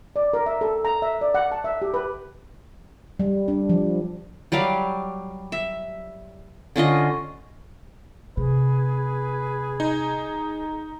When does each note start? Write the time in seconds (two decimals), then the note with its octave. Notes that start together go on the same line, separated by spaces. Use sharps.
0.16 D5
0.33 A#4
0.46 E5
0.61 A4
0.85 A#5
1.02 E5
1.21 D5
1.35 F#5
1.52 A5
1.64 E5
1.82 G4
1.94 B4
3.19 G3
3.48 D4
3.69 F3
4.52 F#3 G3 G4 F5
5.52 E5
6.76 D3 C#4 F4 D#5
8.37 C3 G#4 B4
9.80 D#4